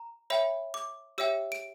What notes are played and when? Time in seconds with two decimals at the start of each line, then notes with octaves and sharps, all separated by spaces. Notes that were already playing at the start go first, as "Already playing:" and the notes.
Already playing: A#5
0.30 C#5 E5 G5 B5
0.74 D6
1.18 G4 C#5 E5 G5 E6
1.52 D7